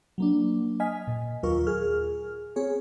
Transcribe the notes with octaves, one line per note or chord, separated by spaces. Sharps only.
F#3 A#3 D4
D#5 G#5 F6 B6
A#2
D#2 F#3 F4 A#4 C#6
G#4 F6
C4 G#4 C#5